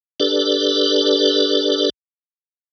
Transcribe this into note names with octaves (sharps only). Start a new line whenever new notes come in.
D4 G4 A4 B4 D5